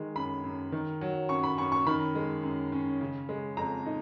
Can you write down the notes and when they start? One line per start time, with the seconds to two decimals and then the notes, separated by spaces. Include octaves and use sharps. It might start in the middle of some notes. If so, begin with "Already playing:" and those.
Already playing: D#3 G#3
0.16 F#2 B5
0.44 F#2
0.72 D#3
1.01 F#3
1.29 F#2 C#6
1.43 B5
1.58 F#2 C#6
1.72 C#6
1.86 D#3 B5
2.15 G#3
2.43 F#2
2.72 C#4
3.01 C#3
3.29 G#3
3.57 F2 A#5
3.86 D#4